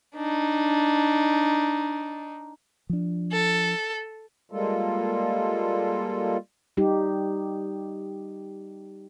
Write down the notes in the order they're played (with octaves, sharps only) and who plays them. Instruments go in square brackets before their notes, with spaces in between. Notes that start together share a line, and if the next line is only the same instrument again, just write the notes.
[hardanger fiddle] D4 D#4
[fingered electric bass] F3 D4
[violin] A4
[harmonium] G3 G#3 A#3 F4 A4
[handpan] G3 D#4 G4